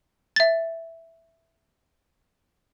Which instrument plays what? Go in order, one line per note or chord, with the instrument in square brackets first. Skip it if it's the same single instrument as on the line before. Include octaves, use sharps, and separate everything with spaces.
[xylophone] E5 A6